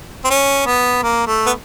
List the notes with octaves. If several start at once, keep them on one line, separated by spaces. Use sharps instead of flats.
C4
C#4
B3
A#3
A3
B3